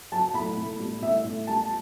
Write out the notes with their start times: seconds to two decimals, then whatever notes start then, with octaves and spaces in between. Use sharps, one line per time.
0.12 F#3 A5
0.34 A2 B5
0.57 A2
0.79 G3
1.02 A2 E5
1.24 A2
1.47 G3 A5